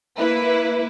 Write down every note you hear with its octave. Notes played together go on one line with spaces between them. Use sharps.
A#3 E4 B4